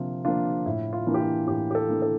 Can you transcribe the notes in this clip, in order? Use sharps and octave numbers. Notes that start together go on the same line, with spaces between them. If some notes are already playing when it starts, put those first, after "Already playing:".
Already playing: C3 F3 A#3 D4 F4
F3 A#3 D4 F4
A2 E4
F4
E3 A#3 D4
G4
F4
A2 G4
G4
A4
E3 A#3 D4
A4